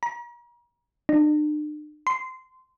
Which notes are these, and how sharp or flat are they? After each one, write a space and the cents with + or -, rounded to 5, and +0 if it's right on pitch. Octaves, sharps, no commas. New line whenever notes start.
A#5 +40
D4 +45
C6 -20